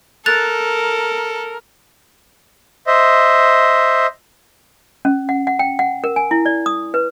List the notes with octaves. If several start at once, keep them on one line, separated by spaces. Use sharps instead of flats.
A4 A#4 F#6 A6 F7
C5 D#5 E5
C#4
F#5
F#5
G5
F#5
A#4
G#5
E4
D5
D#6
B4